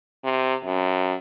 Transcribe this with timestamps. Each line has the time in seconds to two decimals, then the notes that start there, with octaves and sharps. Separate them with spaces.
0.24 C3
0.65 F#2